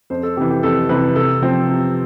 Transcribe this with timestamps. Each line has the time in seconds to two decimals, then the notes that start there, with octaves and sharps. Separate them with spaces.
0.10 F2 C5
0.23 A4
0.37 C3 G4
0.41 E3
0.50 G4
0.63 F2 A4
0.89 C3 E3 B4
1.16 C3 A4
1.42 F3 C4
1.68 C3